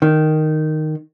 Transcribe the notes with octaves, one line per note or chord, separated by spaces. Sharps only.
D#3